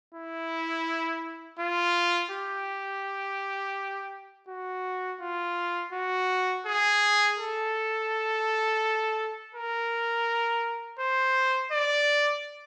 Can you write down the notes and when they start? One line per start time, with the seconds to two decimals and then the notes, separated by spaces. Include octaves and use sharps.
0.15 E4
1.60 F4
2.31 G4
4.49 F#4
5.21 F4
5.93 F#4
6.66 G#4
7.38 A4
9.55 A#4
10.99 C5
11.72 D5